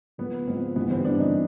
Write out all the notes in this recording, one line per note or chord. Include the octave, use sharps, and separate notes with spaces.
G#2 F3 B3
G#2 F3 C4
G2 E3 G3 B3
C4
G2 E3 G3 D4
D#4